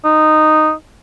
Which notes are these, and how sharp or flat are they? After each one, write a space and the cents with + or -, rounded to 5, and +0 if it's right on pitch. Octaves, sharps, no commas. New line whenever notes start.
D#4 -10